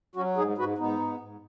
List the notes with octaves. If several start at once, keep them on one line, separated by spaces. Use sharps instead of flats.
F#3 C#4 F#4
G#2 D#4 G#4
G#2 F#4 B4
G#2 B3 D#4
G#2
G#2